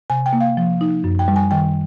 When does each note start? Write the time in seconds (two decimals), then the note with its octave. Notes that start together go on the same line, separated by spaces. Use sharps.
0.10 C3 G#5
0.26 G5
0.33 A#3
0.41 F5
0.57 F3
0.81 D#4
1.04 F#2
1.19 G5
1.28 G3
1.36 G#5
1.51 D#3 G5